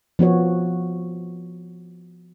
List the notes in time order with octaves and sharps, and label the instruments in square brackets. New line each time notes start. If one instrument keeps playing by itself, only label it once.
[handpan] F3 B3 F#4 C#5